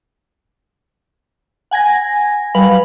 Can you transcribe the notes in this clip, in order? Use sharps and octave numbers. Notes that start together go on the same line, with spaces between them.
F#5 G#5 G#6 A#6
F#3 G3 B4 F5 B5 F#7